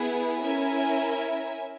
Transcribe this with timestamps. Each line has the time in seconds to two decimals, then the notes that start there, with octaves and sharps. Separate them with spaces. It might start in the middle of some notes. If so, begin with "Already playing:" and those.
Already playing: B3 E4 G#4 B4
0.41 C#4 E4 A#4 E5 G#5